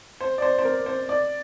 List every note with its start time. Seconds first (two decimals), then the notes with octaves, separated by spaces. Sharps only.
0.21 C5
0.38 D5
0.42 C5
0.58 C5
0.64 A#4
0.86 C5
1.09 D5